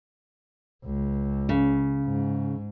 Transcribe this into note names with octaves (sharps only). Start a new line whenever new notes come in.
C#2
C#3
G#2